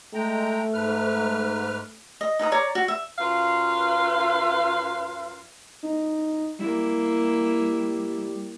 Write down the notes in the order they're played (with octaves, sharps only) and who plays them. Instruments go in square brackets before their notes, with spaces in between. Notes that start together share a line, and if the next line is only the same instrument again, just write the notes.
[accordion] G#3 G5 A#5 [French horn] A3
[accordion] G#2 B4 F6
[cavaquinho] D#5
D#4 B4 A#5 D#6
C#5 D5 A#5
F#4
E5
[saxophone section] F#2 F4 B4 F5
[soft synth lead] D#4
[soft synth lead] G3 [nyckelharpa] A#3 E4